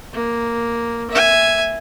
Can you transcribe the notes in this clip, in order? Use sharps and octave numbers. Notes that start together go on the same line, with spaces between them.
A#3
E5 G#5